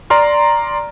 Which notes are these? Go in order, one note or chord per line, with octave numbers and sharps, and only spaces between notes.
D5 A#5 C6 F6